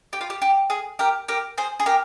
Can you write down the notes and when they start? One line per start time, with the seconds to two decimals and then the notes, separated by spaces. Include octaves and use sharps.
0.13 G4
0.21 F4
0.30 G4
0.42 G4
0.70 G#4
0.99 G4 A#4
1.28 G4 A#4
1.58 G#4 C5
1.80 G#4
1.86 G4 A#4